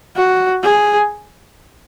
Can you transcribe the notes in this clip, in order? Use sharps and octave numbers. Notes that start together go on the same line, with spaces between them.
F#4
G#4